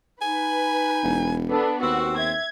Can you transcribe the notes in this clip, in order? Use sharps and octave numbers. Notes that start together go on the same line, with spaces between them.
D#4 B4 G#5
E1
B3 D4 A4
D#2 C4 F#4 E6
E5 G#6